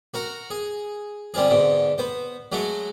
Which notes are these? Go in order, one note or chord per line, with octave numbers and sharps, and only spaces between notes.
F#4 A#4 F#5
G#4
D3 G3 C4 F4 G#4
G#2 B2 D3
B3 C5
F#3 G#3 A3 F#4